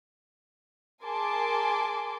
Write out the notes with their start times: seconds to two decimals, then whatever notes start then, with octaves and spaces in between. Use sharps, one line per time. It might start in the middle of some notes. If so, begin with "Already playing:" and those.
1.03 G#4 A#4 G#5 A5 C6 D6